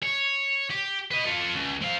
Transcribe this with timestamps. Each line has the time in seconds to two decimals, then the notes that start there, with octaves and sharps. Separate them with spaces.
0.03 C#5
0.70 G4
1.11 B4 D#5
1.26 F4 A4
1.56 C#2
1.82 C4 F5